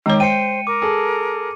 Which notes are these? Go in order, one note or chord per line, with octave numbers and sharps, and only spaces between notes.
D#3 G#3 C#5 A#5 D6
C5 G5 C#7 D#7
A#4 D6
G#4 A4